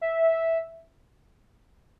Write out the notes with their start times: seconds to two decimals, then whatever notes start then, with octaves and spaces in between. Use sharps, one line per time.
0.01 E5